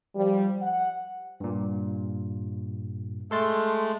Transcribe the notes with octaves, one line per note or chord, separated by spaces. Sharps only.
F3 G3
F#5
G2 A#2
G#3 A3 A4 C6 A6